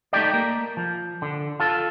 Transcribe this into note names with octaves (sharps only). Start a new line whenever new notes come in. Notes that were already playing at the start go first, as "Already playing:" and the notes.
A3 D#4 G4 D5
A#3
F3
D3
F4 A4